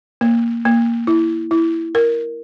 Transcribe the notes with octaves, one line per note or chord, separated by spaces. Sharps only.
A#3
A#3
E4
E4
A#4